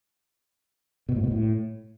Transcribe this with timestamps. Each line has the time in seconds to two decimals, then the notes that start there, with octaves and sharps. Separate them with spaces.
1.09 B2
1.16 A2
1.24 B2
1.31 A2